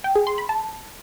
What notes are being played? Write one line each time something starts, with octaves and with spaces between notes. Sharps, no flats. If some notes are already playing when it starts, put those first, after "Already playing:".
G5
G#4
C6
B5
A5